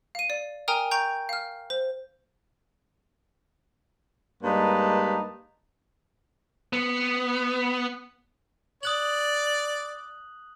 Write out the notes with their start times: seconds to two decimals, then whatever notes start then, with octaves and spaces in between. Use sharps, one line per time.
0.15 F5 D#7
0.30 D5
0.68 A#4 G5 G#5 A#5 D#6 F6
0.91 G5 A#5 C#6 G6
1.29 F5 F6
1.70 C5
4.44 G2 G#3 A#3 D#4 B4 A5
6.73 B3
8.83 D5 D#6 F#6 F#7